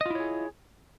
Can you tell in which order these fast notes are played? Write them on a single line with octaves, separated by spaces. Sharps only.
D#5 F4 E4 C#5 G#4